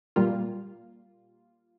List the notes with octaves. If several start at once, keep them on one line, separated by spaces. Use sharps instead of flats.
A#2 G3 A#3 F4